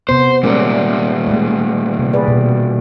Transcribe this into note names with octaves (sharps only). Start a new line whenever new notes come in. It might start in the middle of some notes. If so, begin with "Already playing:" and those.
C3 B3 C5
A#2 G3 G#3 C#4 A#4
G#3 A3
C3
G#4 B4 D5
B2